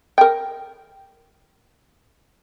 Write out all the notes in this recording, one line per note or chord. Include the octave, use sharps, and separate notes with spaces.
A#4 G5